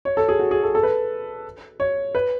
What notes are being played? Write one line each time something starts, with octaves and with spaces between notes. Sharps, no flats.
C#5
A4
G#4
F#4
G#4
A4
A4
B4
C#5
B4